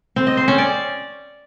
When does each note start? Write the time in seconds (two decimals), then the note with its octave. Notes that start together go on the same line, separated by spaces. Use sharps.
0.16 C4
0.27 D#5
0.37 C5
0.48 C#4
0.58 D5